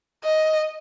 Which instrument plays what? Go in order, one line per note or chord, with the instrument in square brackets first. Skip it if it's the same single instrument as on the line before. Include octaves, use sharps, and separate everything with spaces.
[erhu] D#5